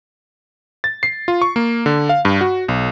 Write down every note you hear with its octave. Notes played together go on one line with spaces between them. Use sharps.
A6
C7
F4
C#6
A#3
D3
F5
G2
F#4
B1